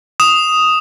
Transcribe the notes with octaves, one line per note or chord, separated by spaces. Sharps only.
D#6 E7